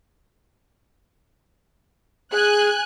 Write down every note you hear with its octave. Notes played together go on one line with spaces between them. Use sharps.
G#4 G#5 F#6